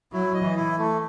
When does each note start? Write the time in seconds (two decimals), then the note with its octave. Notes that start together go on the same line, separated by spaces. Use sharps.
0.12 F#3 E4
0.34 D#5
0.42 E3
0.56 E4
0.78 A3